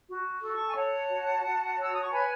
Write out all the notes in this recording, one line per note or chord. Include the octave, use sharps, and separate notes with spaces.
F#4
A4
A5 C#6
G#5
C#5 F#5 A5
F#4
F#4
C#5 E6
D#6
C#6
B4 G#5 B5